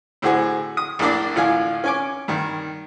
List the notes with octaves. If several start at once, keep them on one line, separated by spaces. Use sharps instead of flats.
A2 D3 C4 F#4 G#4
D#6
A#1 A2 A#3 D4 D5
A1 A2 D3 F4 F5 G#5
C#4 G#5 D6
G2 D#3